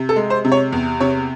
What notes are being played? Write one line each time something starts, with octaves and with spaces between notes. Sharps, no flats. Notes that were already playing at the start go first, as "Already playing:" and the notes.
Already playing: C3
A4
G#3
C5
C3
C#5
E2
C3 C#5